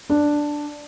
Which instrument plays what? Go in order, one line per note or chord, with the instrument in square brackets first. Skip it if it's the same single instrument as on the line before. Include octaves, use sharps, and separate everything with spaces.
[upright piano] D4